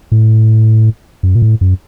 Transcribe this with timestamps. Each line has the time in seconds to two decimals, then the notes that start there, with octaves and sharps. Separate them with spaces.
0.12 A2
1.23 F#2
1.35 A#2
1.42 A2
1.61 F#2